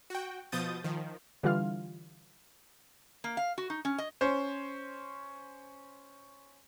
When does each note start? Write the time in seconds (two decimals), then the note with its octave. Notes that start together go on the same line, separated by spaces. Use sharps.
0.10 F#4 G5
0.52 B2 F3 D#6 G6 A6
0.84 D#3 F3
1.43 D3 E3 G3 F4 F5 F6
3.24 A#3
3.37 F5
3.58 F#4
3.70 D#4
3.85 C#4
3.98 D#5
4.21 C#4 C5